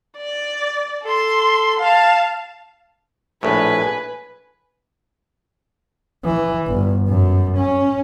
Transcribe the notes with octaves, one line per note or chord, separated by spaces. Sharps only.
D5
A4 C6
F5 A5
A#1 A2 B4 G#5
E3
G1
F#2
C#4